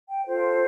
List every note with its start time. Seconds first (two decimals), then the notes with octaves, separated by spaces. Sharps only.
0.10 G5
0.27 F4 A4 C5